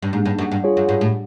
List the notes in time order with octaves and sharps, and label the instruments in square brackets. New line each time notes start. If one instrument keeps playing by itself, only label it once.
[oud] G2
[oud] G#2 [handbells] A#3 D#4 G#4
[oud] G2
F#2
G2
[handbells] F4 G#4 C#5
[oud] F#2
G2
A2